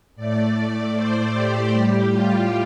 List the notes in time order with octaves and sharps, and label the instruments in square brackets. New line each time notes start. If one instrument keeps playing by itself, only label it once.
[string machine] A2 A3 D5
D5
C5
G4
A2 G3
F4